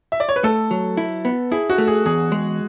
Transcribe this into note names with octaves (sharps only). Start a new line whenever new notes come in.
E5
D5
C#5
B4
A3 A4
F#3
E4
B3
E4 G#4
F#4
A3
G#4
E2 G#4
G#3